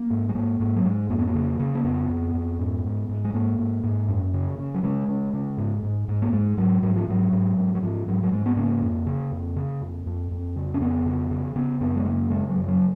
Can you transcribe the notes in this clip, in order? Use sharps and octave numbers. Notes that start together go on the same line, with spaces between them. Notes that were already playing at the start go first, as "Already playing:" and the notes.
Already playing: A#3
G#2
G#3
G#2 A#3
G#2 A#3
F#3
G#2 G#3
F2 A#3
B3
A#3
C#3
C#3
A#3
F2 B3
F2
F2
G#2
G#2
G#2
G#3
G#2 A#3
G#2
G#2
F#2
C#3
C#3
F#3
C#3 G#3
C#3
C#3
G#2
G#2
G#2
A#3
G#2 G#3
G#2 F#3
G#2 F#3
F3
G#2 F#3
G#2
G#2
F#3
G#2 F3
G#2 F#3
F#3
G#2 G#3
B3
C#3 A#3
F2
C#3
F2
C#3
F2
F2
F2
C#3
C#4
F2 B3
C#3
C#3
C#3 B3
F#2 B3
G#3
C#3 A#3
C#3 G#3
F#3
F#2
F3
F#3